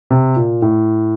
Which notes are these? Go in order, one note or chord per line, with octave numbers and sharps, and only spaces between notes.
C3
A#2
A2